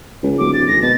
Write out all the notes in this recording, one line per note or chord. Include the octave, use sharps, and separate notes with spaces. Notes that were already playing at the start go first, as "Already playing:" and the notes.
C#2
D1 D6
A6
G#1 A#6
B2 A6